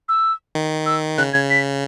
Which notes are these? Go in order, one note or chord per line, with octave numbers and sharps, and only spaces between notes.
E6
D#3
E6
C#3 F#6
C#3 G#6
B6